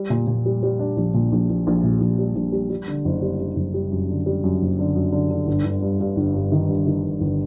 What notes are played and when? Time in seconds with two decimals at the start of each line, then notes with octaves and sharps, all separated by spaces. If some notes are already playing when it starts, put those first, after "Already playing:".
Already playing: G3
0.10 A#2
0.27 A#2
0.46 G3
0.63 G3
0.79 D4
0.97 A#1
1.14 A#2
1.32 A#1
1.49 A#1
1.67 A#1
1.84 A#2
2.01 A#1
2.19 G3
2.35 A#1
2.52 G3
2.70 G3
2.88 D3
3.05 F#1
3.22 G3
3.40 G3
3.56 F#1
3.74 G3
3.91 F#2
4.09 D3
4.26 G3
4.44 F#2
4.61 F#1
4.79 D3
4.96 F#2
5.12 D3
5.31 D3
5.47 G1
5.64 G1
5.82 G2
6.00 G2
6.16 G1
6.34 G2
6.52 D#3
6.68 G2
6.86 D#3
7.03 G2
7.21 G1